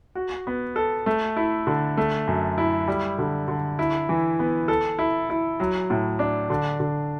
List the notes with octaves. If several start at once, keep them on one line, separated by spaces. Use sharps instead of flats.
F#4
B3
A4
A3
E4
D3
A3
F#2
E4
G3
D3
D3
E4
E3
B3
A4
E4
E4
F#3
A2
D4
D3
D3